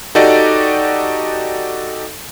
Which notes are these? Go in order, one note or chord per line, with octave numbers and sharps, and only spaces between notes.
D#4 F#4 G4 A4 D5 D#5